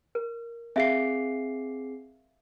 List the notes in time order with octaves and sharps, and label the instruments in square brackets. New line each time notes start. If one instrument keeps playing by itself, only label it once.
[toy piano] A#4
[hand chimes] C4 G#4 C7 [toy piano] E5 F5